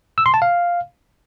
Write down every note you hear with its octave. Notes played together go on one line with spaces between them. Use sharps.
E6
C6
A5
F5